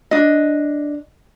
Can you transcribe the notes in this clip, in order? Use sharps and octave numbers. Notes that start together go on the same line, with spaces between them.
D4 D#5